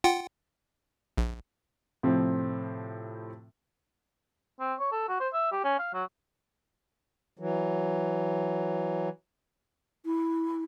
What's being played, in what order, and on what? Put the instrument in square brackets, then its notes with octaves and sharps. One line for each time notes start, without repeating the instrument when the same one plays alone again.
[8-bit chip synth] F4 F#5 G5
A#1
[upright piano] A2 C3 F3 C4
[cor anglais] C4
C#5
A4
F#4
C5
E5
G4
C#4
F5
F#3
[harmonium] E3 F#3
[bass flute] E4